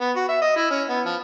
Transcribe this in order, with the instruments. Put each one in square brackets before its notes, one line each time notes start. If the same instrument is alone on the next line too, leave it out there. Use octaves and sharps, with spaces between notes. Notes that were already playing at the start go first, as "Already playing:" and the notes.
[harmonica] B3
F#4
E5
D#5
E4
C#4
B3
F3